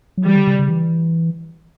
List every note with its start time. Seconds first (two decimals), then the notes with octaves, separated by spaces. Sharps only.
0.18 F#3
0.25 E3 G3
0.36 D3
0.47 C#3
0.59 C#3
0.69 E3